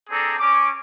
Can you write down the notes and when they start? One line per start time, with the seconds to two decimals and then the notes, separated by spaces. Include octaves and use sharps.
0.10 C4 D4 G#4 A4 A#5
0.39 C#4 D6